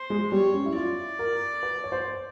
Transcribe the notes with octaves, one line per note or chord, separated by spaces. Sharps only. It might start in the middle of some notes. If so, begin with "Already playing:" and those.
Already playing: C5
G#3
G3 C#5
C#4
E4
F4 D5
A#4
B4
C#5
C5